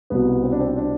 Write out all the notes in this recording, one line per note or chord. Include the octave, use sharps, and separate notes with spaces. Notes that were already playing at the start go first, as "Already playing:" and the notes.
C2 B2 B3
C4
D4
C4
D4